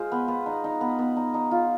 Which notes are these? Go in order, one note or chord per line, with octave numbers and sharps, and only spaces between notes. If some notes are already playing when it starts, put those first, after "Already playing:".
Already playing: G#3 F4 G#4 C5
B3
B3
D#4
D#4
B3
B3
D#4
D#4
F4